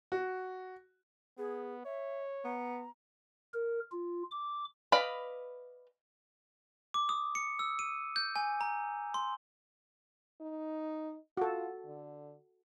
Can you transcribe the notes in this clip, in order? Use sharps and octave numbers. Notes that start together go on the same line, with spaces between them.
F#4
B3 G#4
C#5 E5
B3 A#5
A#4
F4
D6
B4 D5 D#5 F5 B5
D6
D#6
C#7
E6
D#7
G6
G#5
A#5
C6
D#4
F4 F#4 A4
D3